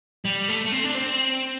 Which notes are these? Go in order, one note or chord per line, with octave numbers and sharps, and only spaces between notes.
G3
A3
A3
C4
D4
C4